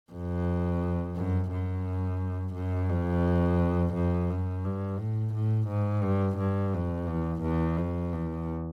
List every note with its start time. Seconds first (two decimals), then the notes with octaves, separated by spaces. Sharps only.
0.12 F2
1.16 F#2
1.51 F#2
2.55 F#2
2.89 F2
3.94 F2
4.30 F#2
4.64 G2
4.99 A2
5.34 A2
5.68 G#2
6.04 G2
6.38 G2
6.74 F2
7.08 E2
7.43 E2
7.78 F2
8.13 E2